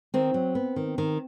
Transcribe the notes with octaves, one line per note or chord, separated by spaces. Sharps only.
D#3 C4
F#3
B3
D#3
D#3